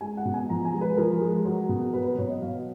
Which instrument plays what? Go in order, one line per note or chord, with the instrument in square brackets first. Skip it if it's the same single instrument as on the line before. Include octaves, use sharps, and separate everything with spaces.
[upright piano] G#3 G#5
F#5
B2
G#5
F3 A#5
G#5
G#3
B4
F3 A#4
G#3
F#3
B2
F#3 B4
B4
B2 C#5
D#5
F#3 F5